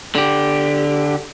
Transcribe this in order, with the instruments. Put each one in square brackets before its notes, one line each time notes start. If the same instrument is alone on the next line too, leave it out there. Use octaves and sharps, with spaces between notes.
[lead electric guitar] D3 G4